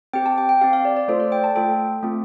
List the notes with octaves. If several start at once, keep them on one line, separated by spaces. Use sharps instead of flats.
C4 G4 G5
A5
G5
G5
C4 G4 F5
F5
D5
D5
A3 F4 A4 C5
D5
G5
A5
A3 F4 A4 G5
A3 C4 F4